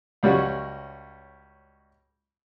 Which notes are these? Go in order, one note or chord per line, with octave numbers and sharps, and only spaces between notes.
C#2 G3 C#4 F#4